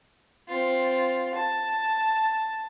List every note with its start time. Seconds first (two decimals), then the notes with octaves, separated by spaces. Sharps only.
0.48 C4 F4
1.35 A5